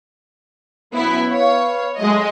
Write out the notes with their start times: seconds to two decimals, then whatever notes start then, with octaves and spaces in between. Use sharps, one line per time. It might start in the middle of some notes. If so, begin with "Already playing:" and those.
0.93 B2 F#3 B3 C#4 E4
1.32 B4 C#5 F5
1.98 F#3 G#3 A3 D#5